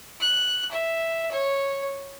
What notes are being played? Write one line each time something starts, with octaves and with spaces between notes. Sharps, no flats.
F#6
E5
C#5